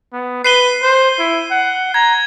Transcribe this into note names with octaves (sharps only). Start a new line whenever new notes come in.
B3
B4 C7 D#7 G7
C5
E4
F#5
A#5 G#6